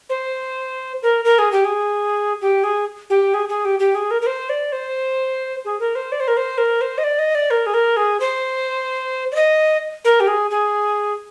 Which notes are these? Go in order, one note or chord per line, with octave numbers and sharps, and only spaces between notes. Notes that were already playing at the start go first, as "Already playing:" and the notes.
C5
A#4
A#4
G#4
G4
G#4
G4
G#4
G4
G#4
G#4
G4
G4
G#4
A#4
A#4
C5
D5
C5
G#4
A#4
C5
D5
C5
A#4
C5
A#4
C5
D#5
D5
D#5
D5
A#4
G#4
A#4
G#4
C5
D5
D#5
A#4
G4
G#4
G#4